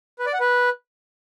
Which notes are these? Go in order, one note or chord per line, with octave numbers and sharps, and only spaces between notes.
B4
D5
F#5
B4